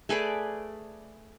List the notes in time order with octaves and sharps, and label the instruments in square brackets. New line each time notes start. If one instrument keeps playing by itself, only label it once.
[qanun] A3 G#4 B4 D5